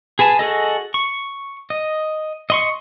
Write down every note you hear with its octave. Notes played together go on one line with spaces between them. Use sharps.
G#4 B4 G#5 A5
F#4 G#4 A4 D#5
C#6
D#5
D#5 C6 C#6